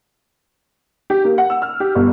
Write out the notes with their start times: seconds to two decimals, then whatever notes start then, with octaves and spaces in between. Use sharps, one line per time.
1.10 G4
1.25 A#3
1.38 F#5
1.50 E6
1.62 F6
1.80 G4
1.95 G1